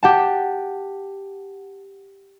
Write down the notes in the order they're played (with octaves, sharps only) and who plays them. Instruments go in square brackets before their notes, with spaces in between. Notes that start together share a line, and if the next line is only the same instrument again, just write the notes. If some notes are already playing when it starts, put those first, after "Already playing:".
[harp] G4 F#5 A5